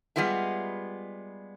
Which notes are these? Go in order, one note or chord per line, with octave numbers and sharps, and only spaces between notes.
G3 G#3 B3 F4 E5